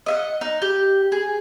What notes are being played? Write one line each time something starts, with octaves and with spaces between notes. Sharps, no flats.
D#5 E5 F#5
D#4
G4
G#4